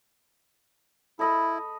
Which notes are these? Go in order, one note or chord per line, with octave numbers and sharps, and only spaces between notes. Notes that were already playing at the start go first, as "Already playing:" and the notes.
E4 A4 D#5 B5